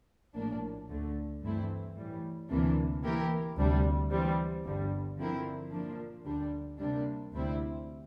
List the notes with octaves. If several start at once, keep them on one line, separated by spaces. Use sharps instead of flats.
A#1 A2 F3 A#3 D4
D2 D3 A3
G2 E3 A3 C4 E4
A2 E3 G3
D2 C3 E3 A#3 D4
E3 A#3 E4 G4 A#4
D2 C3 G3 D4
E3 G3 C4
G1 G2 D3 G3
D3 F3 C4 E4 A#4
A#2 F3 A#3 D4
D2 D3 G3 D4
C3 G3 A#3 D4
D2 C3 G3 C4 E4